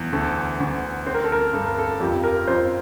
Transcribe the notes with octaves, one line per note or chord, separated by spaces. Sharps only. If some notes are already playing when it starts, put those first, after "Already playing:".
Already playing: E2
D2 A4
D2
C4 C5
A#4
A4
A#4
G2 A4
A#4
A4
F2 G4
A#4
F2 C5